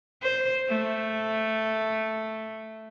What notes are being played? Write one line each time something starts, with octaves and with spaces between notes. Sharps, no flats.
C5
A3